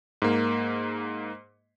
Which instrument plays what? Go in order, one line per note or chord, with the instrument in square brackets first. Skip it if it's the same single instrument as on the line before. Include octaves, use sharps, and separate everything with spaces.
[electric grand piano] G#2 A#3